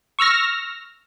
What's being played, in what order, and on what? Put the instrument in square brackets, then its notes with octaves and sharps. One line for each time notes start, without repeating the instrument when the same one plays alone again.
[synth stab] C#6 E6 F6 A#6